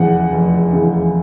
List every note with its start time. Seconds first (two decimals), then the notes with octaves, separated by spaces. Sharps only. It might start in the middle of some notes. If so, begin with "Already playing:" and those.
Already playing: F1 E2 C#3 F#5
0.31 F1
0.73 E2 C#3